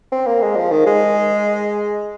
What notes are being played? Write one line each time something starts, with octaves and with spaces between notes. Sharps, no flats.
C4
A#3
G#3
F3
D#3
G#3